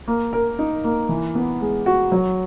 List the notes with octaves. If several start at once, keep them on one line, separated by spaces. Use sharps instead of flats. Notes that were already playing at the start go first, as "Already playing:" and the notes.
A#3
A#4
D#4
A#3
E3
B3
G#3
F#4
F#3